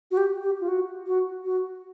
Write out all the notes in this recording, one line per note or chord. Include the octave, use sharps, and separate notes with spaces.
F#4
G4
G4
F4
F#4
F#4
F#4